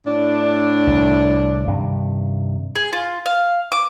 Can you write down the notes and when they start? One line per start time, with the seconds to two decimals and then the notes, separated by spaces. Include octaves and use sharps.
0.06 A2 D4
0.87 C2
1.67 G2 C3 D#3
2.75 G#4
2.93 F4
3.26 F5
3.72 D6